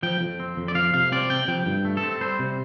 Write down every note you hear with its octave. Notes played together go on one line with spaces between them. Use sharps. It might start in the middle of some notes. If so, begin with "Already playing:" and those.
F3 G5
F2
C4
F2
D5
F3 F5
C3 F5
C4 D5
C3 G5
F3 G5
G2
A3
A4
C4
G3 C5
C3